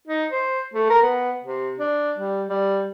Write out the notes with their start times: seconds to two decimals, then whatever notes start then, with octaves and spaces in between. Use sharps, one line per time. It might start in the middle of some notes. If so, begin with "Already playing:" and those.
0.07 D#4
0.31 C5
0.73 A3
0.90 A#4
1.02 B3
1.43 C3
1.78 D4
2.18 G3
2.49 G3